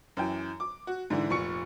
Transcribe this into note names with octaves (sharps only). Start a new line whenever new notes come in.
F#2 E3 G5
D6
F#4
G#2 D3 E3
F1 A#2 C#6 C#7